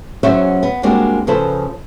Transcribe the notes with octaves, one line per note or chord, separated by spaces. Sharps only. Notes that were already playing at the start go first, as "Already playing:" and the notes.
E2 F#3 C#4 C5 C#5 E5
B3
G3 G#3 A#3 C4 D4 F#4
C#3 F3 A4 B4 C5